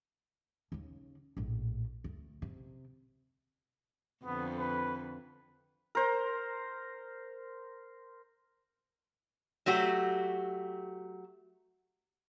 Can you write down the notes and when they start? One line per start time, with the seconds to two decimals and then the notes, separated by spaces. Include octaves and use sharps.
0.72 D#2 C#3
1.37 A#1 A2
2.04 D2
2.42 C3
4.25 F2 D3 B3
4.59 B4
5.95 A#4 C5
9.66 F#3 A3 F#4 G4